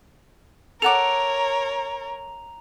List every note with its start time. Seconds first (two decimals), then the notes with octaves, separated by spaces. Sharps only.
0.82 A4 A#4 C#5 F#5 A#5 D6 F7